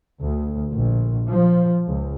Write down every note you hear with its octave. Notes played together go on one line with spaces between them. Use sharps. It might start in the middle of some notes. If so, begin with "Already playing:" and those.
D2
A#1
F3
C#2